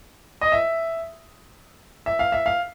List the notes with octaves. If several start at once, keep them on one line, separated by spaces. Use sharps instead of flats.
D#5
E5
E5
F5
E5
F5